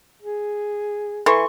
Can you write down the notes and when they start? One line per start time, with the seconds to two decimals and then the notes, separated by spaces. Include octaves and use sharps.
0.22 G#4
1.26 E3 A4 C6 C#6